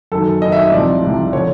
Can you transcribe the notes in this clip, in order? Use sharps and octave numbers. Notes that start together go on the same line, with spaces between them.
F#2 D#3 A4
F#2 D#3 D#5
E5
D#5
C2 C3 F3 D5
C2 C3 F3
D3 F3 C#5